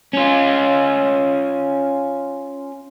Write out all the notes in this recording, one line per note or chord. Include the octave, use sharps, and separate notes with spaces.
C#4 F4